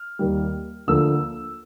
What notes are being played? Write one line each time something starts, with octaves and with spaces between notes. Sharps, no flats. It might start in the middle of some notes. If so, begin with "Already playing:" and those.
Already playing: F6
D#2 D#3 G3
D2 D3 F3 A#3 E6